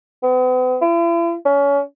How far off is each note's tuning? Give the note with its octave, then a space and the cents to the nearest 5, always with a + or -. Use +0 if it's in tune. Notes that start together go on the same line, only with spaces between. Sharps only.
B3 +45
E4 +45
C#4 +25